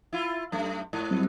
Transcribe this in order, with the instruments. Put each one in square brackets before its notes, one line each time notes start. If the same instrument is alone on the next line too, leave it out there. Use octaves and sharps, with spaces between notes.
[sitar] E4 F4
F#2 A3
G#2
[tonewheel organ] F#3 G3 C4